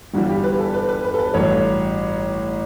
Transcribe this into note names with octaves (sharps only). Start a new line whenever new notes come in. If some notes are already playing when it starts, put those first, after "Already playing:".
G1 G2 E3 G3 F#4
G4
B4
A4
B4
B4
B4
A4
B4
A1 G2 F#3 C#5